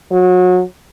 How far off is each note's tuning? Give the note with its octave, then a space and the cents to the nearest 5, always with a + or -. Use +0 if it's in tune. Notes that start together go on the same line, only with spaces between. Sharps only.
F#3 -30